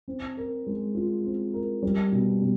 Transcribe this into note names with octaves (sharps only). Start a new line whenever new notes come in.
C4
A#4
G#3
F4
C4
A#4
G3
B2
B2